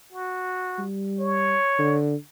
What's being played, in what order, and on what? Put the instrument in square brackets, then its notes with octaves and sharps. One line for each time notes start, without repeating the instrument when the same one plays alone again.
[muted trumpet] F#4
[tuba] G3
[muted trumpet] C#5
[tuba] D3